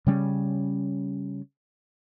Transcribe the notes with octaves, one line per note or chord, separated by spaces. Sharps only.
C#3 G3 C#4